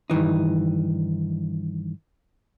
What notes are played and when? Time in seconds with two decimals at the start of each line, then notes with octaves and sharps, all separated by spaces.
0.10 G2 D#3 E3 D#4